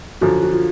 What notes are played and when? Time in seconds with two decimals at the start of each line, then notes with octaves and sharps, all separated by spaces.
0.21 F#2 D3 F3 F#4
0.43 F#4
0.54 F4